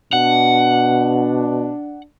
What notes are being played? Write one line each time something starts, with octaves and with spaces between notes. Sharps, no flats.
B2 D4 F#5